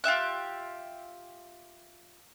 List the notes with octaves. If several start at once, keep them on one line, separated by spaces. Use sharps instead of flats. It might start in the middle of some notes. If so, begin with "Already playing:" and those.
F4 G4 E5 F#6